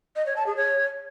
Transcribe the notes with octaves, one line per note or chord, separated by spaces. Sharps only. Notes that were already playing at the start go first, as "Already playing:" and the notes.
D#5
C#5
A5
G#4
C#5